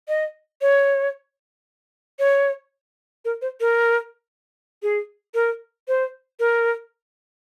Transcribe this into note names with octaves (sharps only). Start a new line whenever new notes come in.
D#5
C#5
C#5
A#4
C5
A#4
G#4
A#4
C5
A#4